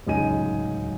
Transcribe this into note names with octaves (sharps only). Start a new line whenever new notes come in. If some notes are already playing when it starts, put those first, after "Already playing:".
D1 C#2 F#2 D#4 G#5 D#7